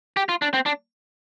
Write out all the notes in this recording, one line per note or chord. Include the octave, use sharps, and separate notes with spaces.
G4
F4
D4
C4
D4